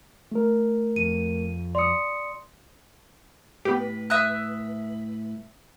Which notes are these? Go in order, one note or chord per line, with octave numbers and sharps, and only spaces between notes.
A3 A#4
F2 D#7
D5 C6 D#6 C#7
A2 B3 G4 B4
E5 D#6 F#6